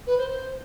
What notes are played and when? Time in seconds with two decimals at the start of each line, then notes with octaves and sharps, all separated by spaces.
0.06 B4
0.17 C5
0.28 C5